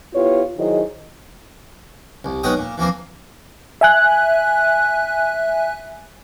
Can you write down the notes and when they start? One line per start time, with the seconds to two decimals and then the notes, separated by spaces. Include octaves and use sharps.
0.14 B3 E4 F4 G4 B4 C#5
0.58 D#3 F#3 E4 G#4 C5 D#5
2.24 C2
2.43 B1 G#3 B3 C#4 G5 D#6
2.57 A#2
2.78 E3 F3 A#3 C4
3.81 E5 G#5 F#6